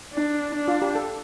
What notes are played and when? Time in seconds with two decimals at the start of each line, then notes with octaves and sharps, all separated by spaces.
0.13 D4
0.54 D4
0.68 F4
0.82 G4
0.95 A4